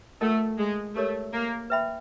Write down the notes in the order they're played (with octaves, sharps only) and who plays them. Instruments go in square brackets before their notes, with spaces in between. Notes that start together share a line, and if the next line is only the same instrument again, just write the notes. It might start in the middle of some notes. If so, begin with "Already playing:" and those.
[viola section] A3 [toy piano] F4 A#4 D#5 F#5 A5
[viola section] G#3
[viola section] A3 [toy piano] G4 A#4 C#5
[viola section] A#3
[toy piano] B4 E5 G5 B5